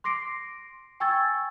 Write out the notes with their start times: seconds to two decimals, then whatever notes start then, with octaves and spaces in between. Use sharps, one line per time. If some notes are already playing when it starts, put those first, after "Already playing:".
0.04 C6 D6 A#6 C7 D7
1.00 G5 G#5 C#6 E6 G#6 A6